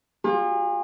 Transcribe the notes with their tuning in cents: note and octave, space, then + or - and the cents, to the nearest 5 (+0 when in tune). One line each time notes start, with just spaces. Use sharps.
F4 +30 G#4 -40